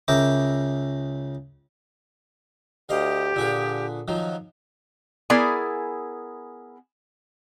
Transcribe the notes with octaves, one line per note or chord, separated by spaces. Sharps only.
C#2 C#3 A#4 E5 G5 D6
D2 G4 D#5 F5
A#2 D3 G#4 B4
D#3 F3 F#3
B3 E4 G#4 A#4 D5 G#5